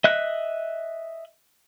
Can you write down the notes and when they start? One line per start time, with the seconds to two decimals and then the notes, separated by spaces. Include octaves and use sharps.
0.04 D#5 E5 F#6